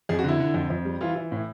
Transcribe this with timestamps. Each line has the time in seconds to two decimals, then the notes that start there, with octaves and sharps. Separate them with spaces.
0.09 F2 G#4
0.19 F#4
0.24 D3 E4
0.40 D3
0.54 F2
0.70 F2
0.85 G3
1.01 E3 F4
1.16 E3
1.32 A2